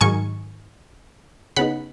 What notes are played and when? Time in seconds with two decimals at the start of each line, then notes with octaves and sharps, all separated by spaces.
0.01 G#2 D#3 F#3 G#5 C#6
1.56 C#3 B3 D#4 F#5 B5